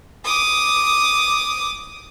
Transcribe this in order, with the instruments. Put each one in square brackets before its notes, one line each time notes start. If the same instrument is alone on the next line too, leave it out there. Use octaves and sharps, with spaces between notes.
[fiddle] D6 D#6